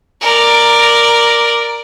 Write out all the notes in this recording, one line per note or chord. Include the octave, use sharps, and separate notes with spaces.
A#4 D5